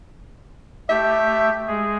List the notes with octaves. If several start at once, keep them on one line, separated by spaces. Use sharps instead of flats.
A3 G4 E5
G#3 G#4